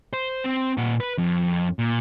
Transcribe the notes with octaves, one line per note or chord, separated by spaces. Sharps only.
C5
C4
A#2 F#5
B4
F2
A#2